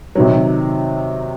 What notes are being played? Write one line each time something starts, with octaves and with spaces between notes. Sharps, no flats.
C3 D#3 F#3